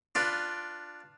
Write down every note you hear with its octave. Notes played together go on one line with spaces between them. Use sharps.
D4 F4 B4